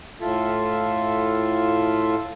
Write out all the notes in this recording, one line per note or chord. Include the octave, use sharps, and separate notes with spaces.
A2 F4 A4 E5